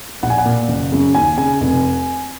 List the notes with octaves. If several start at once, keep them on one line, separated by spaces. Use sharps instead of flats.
A#1 F#5
G#5
F#5
A#2
F#1
F#2 C#3
D#2 G#5
C#3 G#5
F1